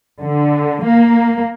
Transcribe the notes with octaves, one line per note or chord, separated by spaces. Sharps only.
D3
A#3